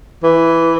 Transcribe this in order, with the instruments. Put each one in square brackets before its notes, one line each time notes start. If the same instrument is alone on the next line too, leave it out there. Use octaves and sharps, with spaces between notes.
[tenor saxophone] E3